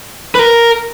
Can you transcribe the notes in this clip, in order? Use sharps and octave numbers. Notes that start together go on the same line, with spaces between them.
B4
A#4